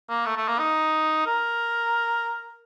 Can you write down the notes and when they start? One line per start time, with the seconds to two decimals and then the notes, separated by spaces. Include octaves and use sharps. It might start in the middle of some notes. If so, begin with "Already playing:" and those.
0.09 A#3
0.26 A3
0.37 A3
0.48 A#3
0.59 D#4
1.26 A#4